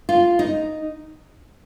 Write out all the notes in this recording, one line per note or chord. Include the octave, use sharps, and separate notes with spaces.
F4
D#4